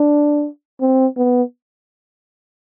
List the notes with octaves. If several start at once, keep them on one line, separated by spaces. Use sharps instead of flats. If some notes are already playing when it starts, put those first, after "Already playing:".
Already playing: D4
C4
B3